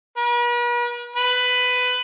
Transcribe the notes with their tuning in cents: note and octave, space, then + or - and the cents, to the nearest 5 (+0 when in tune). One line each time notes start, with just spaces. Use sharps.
B4 -45
B4 +15